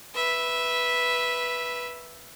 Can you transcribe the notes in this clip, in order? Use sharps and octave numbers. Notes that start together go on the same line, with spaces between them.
B4 E5